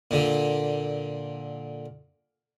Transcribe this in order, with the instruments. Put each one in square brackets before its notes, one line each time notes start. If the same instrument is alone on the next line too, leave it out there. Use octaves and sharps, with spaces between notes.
[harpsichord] A#2 D3